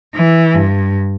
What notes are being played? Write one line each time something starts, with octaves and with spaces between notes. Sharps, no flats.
E3
G2